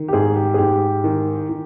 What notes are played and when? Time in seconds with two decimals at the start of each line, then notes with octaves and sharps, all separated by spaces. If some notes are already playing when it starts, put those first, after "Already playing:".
Already playing: D#3
0.08 G4
0.13 G#2 G#4
0.36 G4
0.54 G#4
0.58 G#2 G4
1.04 D#3
1.49 D#3